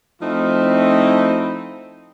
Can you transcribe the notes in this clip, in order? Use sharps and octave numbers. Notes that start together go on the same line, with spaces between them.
F3 A3 C4 D#4 E4